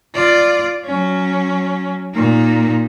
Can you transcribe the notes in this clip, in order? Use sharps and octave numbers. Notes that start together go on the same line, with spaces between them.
F4 D5
F#3 C#4
A#2 D#4